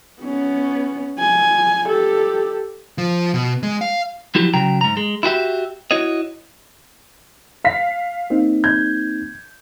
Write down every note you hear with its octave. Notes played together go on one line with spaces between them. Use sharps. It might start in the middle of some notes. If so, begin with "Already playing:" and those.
B3 C#4
G#5
G4 A4
F3
B2
G#3
F5
F3 F#3 E4 G4
C#3 F#3 G5 A#5
G#2 A#5
G#3
E4 F#4 G4 E5
E4 F#4 C#5 D#5
F5 B6
A#3 C4 D#4
G6 G#6